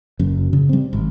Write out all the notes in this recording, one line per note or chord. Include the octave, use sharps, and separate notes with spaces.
F#1 F#2
C#3
G3 C4
G#1